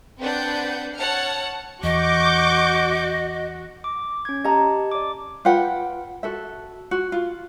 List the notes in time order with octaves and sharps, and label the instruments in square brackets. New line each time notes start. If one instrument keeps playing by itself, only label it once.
[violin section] C4 D4 B4 F#5 G6
C#5 F#5 A5 F6 C#7
[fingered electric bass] E2 [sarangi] F#4 [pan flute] D#5 [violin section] C#6 D6 G6
[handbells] D6
C#4 G#6
[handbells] G4 A5 [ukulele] D#5 A#5
[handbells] D5 D6
[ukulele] F4 B4 F#5 G5
F#4 A4 E5
F#4
F4